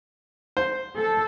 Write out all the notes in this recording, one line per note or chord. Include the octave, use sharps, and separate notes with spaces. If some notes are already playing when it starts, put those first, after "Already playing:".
C5
A4